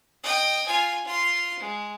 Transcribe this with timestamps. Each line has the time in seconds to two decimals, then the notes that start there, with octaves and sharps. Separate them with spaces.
0.23 D#5 G5
0.66 F4 G#5
1.05 F4 C6
1.59 G#3